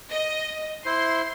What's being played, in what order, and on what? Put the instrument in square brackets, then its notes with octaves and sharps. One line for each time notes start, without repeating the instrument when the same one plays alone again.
[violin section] D#5
[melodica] E4 C5 [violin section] C6